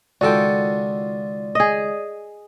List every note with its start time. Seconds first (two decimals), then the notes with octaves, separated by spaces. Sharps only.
0.21 C#2 D#3 F4 F#4 A4 D5 G5
1.55 G#4 D#5